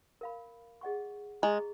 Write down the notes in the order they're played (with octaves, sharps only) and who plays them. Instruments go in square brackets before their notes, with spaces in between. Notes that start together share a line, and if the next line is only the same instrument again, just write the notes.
[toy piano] A#4 F5 B5
G#4 D#5 F#5 C#6
[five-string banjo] G#3 [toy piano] G#4 D#5 A#5 C#6